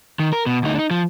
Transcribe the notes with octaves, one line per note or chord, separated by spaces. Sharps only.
D#3
A#4
B2
D2 D#4
D4 D#4
F3